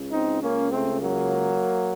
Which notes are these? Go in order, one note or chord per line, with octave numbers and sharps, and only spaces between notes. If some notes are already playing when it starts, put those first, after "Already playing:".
Already playing: C#2 C#3
C4 D#4
A#3 C#4
A3 C4
F#3 A#3